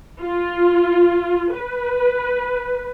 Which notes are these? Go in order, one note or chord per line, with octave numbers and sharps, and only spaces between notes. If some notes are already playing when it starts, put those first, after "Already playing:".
F4
B4